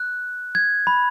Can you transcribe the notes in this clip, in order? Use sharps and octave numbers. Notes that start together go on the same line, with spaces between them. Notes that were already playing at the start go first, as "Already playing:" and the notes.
Already playing: F#6
G#6
B5